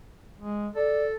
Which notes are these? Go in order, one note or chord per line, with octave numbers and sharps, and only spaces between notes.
G#3
A4 D5